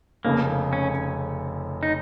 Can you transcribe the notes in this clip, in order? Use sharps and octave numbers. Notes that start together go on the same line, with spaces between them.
F1 F2 C#3 A#3
C#4
D#4